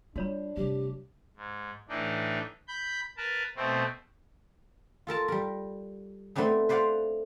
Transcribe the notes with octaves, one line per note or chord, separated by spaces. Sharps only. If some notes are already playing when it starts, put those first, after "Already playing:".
G3 D4 F4 F#4 C#5 B5
F1 G3 G4
G#2
A2 E3 D4 D#4
B5 G6
A#4 B4 A5
B2 A3 C4
F4 A4 A#4 A5
G3 A#4
A3 B3 C4 D4 D#4
B4 C5 D5 F5 F#5